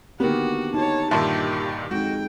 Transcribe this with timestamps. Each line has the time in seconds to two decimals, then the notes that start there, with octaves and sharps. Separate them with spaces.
0.20 D3 D#3 A#3 B3 F#4 G4
0.74 D#4 F#4 C#5 A5
1.11 G2 A#2 D#3 G4 E5 A5 C6
1.91 F2 G#3 D#4 F#4 G5